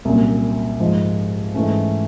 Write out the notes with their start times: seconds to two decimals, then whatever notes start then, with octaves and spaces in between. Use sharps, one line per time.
0.05 C2 A#2 F#3 A#3 C#4
0.80 G#2 F3 G#3
1.55 G#2 E3 A3 C#4